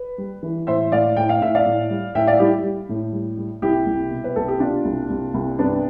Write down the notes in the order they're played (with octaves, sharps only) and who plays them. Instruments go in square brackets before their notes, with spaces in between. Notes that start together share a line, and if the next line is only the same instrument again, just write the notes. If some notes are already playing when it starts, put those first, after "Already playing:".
Already playing: [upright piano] B4
G3
E3
A2 C5 E5
A2 D5 F5
A2 G5
F5
A2 E5
D5 F5
A2
G3
A2 E5 G5
D5 F5
G3 E4 G4
G3
A2
G3
G3
C2 E4 G4
C2
B2
B4
C2 A4
G4
B2 D4 F4
C2
C2
C2
G2 B3 D4